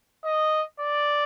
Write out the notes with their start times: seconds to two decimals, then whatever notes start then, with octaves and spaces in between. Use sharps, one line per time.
0.24 D#5
0.80 D5